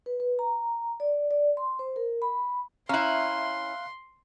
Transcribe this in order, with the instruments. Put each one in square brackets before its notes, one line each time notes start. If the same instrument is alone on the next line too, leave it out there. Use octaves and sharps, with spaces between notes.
[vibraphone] B4
B4
A#5
D5
D5
C6
C5
A#4
B5
[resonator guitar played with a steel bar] C#4 E4 [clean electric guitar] E5 A#5 [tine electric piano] F5 F#6 [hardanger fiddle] C6